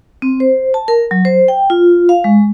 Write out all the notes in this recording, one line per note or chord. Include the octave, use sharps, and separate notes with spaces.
C4
C5
A5
A#4
F#3
C5
G5
F4
F5
G#3